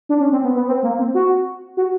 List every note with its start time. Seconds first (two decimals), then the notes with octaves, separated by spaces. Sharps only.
0.09 D4
0.20 C#4
0.32 C4
0.44 B3
0.55 B3
0.67 C4
0.83 A#3
0.99 C4
1.15 F#4
1.77 F#4